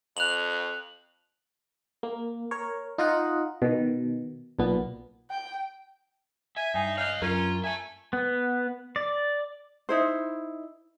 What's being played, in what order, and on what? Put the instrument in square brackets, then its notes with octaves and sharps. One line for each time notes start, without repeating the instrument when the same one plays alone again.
[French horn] F2 [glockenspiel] F#6 F7 F#7
[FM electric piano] A#3
A#4 C#5
D#4 F4 D#5 F#5
B2 D#3
B1 A#2 B3
[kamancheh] G5
[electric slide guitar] E5 [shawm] G#5
[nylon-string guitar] G2 [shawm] D#4 [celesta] G5 G#5 C7
[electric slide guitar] C#5 D#5 [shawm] F5 [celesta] F#6 G6
[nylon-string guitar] F#2 A#4 [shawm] C#4 [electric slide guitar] F4 [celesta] A#5
[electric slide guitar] E5 A5 [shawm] G#5
[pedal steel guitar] B3
D5
[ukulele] D#4 E4 C5